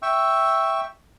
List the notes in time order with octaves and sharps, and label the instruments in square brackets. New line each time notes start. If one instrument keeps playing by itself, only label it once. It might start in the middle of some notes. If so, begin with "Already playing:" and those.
[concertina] E5 G5 C#6 E6